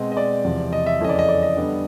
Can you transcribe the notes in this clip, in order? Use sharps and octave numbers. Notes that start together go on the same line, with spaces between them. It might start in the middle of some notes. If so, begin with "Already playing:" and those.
Already playing: B2 G#3 C4 D#5
D#5
D5
E2 C3 F3
D#5
E5
F2 C#3 E3 A3 C#4 D#5
D5
D#5
D5
D#5
D3 G3 B3 D4